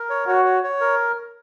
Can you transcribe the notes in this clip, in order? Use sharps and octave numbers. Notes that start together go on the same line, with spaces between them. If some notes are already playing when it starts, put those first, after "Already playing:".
Already playing: A#4
C#5
F#4 C#5
C#5
C#5
A#4